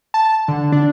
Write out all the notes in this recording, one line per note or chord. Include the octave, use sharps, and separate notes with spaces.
A5
D3
D4